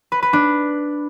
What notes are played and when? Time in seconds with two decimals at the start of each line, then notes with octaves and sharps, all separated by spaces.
0.12 B4
0.22 B4
0.33 D4